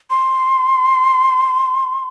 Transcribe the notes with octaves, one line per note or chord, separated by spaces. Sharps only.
C6